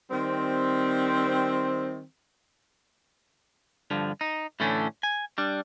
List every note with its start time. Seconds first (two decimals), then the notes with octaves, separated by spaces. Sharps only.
0.11 D#3 G3 C4
3.91 G2 D3 F3
4.21 D#4
4.60 A2 D3 E3 A3 C#4 D4
5.03 G#5
5.38 G3 D4